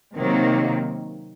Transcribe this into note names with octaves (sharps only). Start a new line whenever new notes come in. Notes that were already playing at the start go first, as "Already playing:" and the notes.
C3 D#3 F#3 A#3